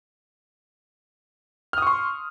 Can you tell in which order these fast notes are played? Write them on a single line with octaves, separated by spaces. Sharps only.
F6 D#6 C#6 C6